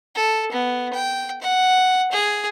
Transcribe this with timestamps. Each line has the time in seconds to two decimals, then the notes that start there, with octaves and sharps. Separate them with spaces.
0.15 A4
0.52 B3
0.93 G5
1.42 F#5
2.12 G#4